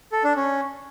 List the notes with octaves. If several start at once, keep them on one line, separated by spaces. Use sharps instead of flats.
A4
D4
C#4